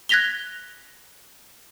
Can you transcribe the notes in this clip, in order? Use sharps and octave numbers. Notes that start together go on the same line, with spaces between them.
F#6 G#6 A#6 B6 F7 G7